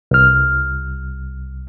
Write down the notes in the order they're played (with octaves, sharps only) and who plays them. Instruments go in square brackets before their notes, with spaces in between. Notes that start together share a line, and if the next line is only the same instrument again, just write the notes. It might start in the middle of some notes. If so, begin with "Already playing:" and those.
[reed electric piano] C2 F6